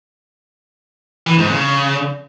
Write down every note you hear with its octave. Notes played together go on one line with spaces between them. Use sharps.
E3
G#2
C#3